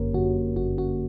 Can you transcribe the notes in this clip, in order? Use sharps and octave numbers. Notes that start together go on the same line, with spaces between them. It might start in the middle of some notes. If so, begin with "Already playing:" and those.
Already playing: G1 F#2 D3 A#3 C#4 G4 A#4 C#5
F#2 D3 F#4
G1 F#4
F#4